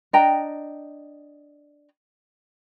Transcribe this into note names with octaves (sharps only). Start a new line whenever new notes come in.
D4 D#5 G5 A#5